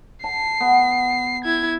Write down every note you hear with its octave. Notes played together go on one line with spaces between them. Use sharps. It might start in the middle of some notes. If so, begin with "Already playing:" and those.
A5 C7
B3
E4 G#6